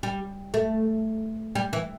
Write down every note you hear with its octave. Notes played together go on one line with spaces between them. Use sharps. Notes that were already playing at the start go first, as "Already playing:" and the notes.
G3
A3
G3
E3